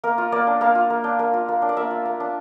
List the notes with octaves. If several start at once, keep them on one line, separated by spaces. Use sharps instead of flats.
A#3 A#4
F4
A#3 D5
D4
A#3 F5
F4
A#3
D4
A#3
F4
A#3
D4
D5
A#3 E5
F4
A#3
D4